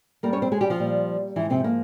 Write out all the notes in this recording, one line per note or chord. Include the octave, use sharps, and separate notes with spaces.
G#2 G3 A#3 A#4
C#4 C#5
C4 C5
G#3 G#4
G3 G4
F3 F4
A#2 G3
G#2 E3 F3 E4
C3 C4
A#3